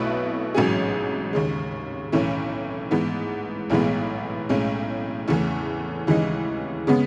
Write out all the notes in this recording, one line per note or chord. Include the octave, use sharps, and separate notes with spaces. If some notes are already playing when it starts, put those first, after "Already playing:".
Already playing: B1 B2 A3 E4 B4
A1 G#2 F#3 C#4 G#4
D#2 C#3 G#3
B1 A2 E3 A3 C#4
G#2 E3 B3
B1 A2 E3 G#3 B3
B1 A2 G#3 C#4
E2 C#3 E3 A3 C#4
D#2 C#3 E3 G#3 D#4
C#3 G#3 B3